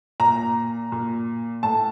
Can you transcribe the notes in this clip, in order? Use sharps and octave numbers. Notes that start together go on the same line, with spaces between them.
A#2 A#5
A#2
A2 A5